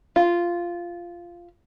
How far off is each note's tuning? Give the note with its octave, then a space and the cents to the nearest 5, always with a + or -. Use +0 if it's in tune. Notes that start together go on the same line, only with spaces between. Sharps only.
F4 -10